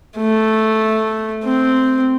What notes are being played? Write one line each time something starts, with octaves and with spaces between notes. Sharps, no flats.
A3
C4